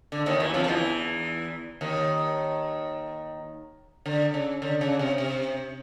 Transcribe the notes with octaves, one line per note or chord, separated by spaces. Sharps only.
D3
D#2 D#3
E2 E3
F2 F3
F3
E2 E3
D#2 D#3
D3
C#3
D3
C#3
C3
C3